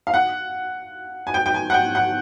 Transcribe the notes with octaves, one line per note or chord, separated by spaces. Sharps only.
F5
F#5
G#5
G5
G5
G#5
F#5
G5
F#5